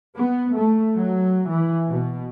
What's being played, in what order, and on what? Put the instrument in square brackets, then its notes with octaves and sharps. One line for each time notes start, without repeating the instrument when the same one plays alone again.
[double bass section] B3
A3
F#3
E3
B2